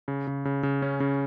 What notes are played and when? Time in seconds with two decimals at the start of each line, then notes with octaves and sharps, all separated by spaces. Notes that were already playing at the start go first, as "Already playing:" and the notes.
0.08 C#3
0.27 C#3
0.45 C#3
0.63 C#3
0.82 C#4
1.00 C#3